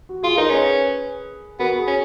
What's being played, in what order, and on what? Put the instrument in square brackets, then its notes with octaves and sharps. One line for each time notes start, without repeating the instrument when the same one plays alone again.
[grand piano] F#4
[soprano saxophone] F4 [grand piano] G#4
[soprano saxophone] D#4 [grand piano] A#4
[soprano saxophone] C#4 [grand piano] G#4 B4
[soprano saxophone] B3 [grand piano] F#4 A#4
[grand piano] G#4
[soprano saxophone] C#4